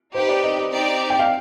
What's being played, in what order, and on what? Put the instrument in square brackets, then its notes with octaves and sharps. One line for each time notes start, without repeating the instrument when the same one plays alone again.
[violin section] D#4 G4 B4 [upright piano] C5
[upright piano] D5
D#5
D#5
[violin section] C4 D#4 G4 D5
[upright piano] G5
F5